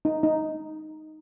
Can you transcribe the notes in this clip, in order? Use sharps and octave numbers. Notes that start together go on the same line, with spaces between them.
D#4
D#4